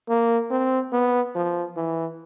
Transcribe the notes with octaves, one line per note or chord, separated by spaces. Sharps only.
A#3
C4
B3
F3
E3